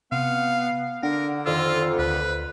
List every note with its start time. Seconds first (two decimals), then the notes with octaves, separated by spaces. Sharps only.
0.12 C3 B3 F5
1.03 D3 D4 A#4 F#5
1.46 F2 D#3 F4 D5 E6
1.99 D2 B4